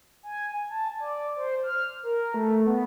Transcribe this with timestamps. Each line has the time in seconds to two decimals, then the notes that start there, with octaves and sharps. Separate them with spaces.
0.23 G#5
0.69 A5
1.00 D5
1.36 C5
1.63 F6
2.03 A#4
2.34 A3
2.66 B3